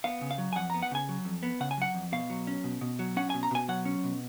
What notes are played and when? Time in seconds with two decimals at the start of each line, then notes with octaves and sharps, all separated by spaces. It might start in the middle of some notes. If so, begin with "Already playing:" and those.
0.04 B3 F5
0.21 C#3
0.31 F5
0.38 F#3
0.53 G#5
0.56 F2 F#5
0.70 B3 A#5
0.83 F#5
0.91 C#3 G#5
1.09 F#3
1.25 F2
1.43 B3
1.60 C#3 F#5
1.71 G#5
1.78 F#3 F#5
1.94 F2
2.12 B2 F5
2.30 F#3
2.47 C#4
2.64 B2
2.81 B2
2.99 F#3
3.17 C#4 F#5
3.30 B2 G#5
3.43 A#5
3.51 B2 G#5
3.68 F#3 F#5
3.85 C#4
4.04 B2